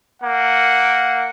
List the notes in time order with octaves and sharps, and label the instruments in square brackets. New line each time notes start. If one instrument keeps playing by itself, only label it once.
[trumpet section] A#3 F#5